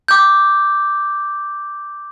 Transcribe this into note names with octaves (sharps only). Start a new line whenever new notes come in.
D6 G6